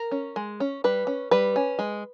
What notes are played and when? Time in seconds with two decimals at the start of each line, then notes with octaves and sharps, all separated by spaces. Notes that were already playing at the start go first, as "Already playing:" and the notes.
Already playing: A#4
0.11 C#4
0.36 G#3
0.60 C#4
0.84 G3 B4
1.07 C#4
1.31 G3 B4
1.56 C#4
1.79 G#3